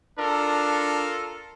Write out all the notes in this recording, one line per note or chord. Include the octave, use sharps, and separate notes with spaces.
D4 F4 A4 A#4